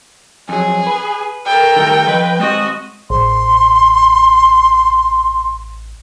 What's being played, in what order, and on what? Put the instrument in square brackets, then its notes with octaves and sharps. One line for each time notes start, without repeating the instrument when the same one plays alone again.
[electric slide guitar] F2 F#3 [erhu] G#4
[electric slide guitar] B4
[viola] A4 A#4 [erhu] G5
[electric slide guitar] D#3 G3 A3
[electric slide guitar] F3 D#5 [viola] B4
[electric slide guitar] G#3 C4 [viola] F#4 D#5
[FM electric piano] A1 [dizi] C6